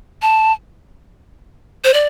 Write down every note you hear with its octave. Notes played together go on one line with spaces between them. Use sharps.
A5
C5
D5